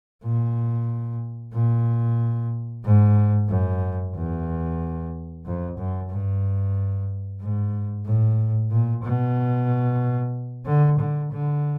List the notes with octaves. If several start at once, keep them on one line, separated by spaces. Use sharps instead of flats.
A#2
A#2
G#2
F#2
E2
F2
F#2
G2
G#2
A2
A#2
B2
D3
D3
D3